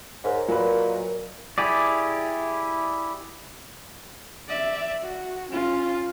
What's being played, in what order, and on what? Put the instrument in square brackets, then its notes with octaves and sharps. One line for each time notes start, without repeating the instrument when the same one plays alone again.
[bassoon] G#2 [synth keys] A#4 C#5 D#5
[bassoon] A#2 [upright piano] F#3 B4
[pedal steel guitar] E4 G4 G#4 D5
[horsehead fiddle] D5 E5
F#4
C#4 F4